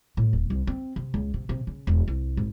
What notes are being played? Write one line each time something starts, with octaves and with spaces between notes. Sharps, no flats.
A2
D#1
C2
C4
C3
C#2
C3
C3
C#3
E1
C2
G#1